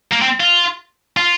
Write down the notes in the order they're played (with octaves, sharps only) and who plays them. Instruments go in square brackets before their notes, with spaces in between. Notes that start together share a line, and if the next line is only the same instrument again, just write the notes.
[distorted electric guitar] A#3
C4
F4
F4